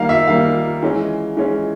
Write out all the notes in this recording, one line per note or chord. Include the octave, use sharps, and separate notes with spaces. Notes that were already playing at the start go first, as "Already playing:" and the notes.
Already playing: D#3 G3 A#3 D#4 F5
E5
D#3 G3 A#3 D#4 F5
E3 G#3 C#4
E3 G#3 C#4